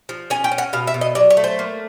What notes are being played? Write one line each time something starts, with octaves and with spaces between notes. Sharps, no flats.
F3
C#4 G#5
G5
C#4
F#5
B2 F5
E5
B2
D#5
F#3 D5
C#5
A3
C5
A#3